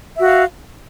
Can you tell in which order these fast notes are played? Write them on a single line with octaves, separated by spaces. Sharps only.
E5 F#4 F5